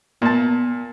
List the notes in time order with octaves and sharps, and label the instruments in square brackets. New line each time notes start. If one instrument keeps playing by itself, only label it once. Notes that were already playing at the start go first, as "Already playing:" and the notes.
[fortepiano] A#2 A5 [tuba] B3